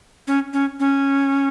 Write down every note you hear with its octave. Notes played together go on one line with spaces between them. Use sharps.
C#4
C#4
C#4